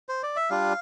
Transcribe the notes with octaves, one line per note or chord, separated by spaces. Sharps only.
C5
D5
E5
G3 D4 F4 F5